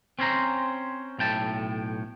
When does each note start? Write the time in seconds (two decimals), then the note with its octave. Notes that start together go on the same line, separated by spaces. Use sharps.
0.19 C4 C#4 C5 A#5
1.19 B1 A2 G5 A5